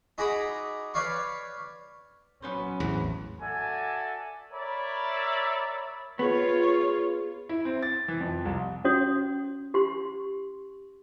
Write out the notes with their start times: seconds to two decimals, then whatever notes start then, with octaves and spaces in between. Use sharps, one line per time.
0.18 D#4 F#4 G#4 A#5 B5 D6
0.94 B4 C#5 D5 F5 C#6
2.42 F#3 B3 C#4 B4 C5
2.80 A1 E2
3.41 F#4 A4 D5 E5 G#5
4.52 A#4 C#5 D5 E5 B5
6.19 B3 F4 G#4 C#5
7.49 E4
7.65 C4
7.83 A6
8.08 E3
8.21 F2
8.45 C2
8.85 C#4 F#4 C#5 D#6
9.74 G4 C6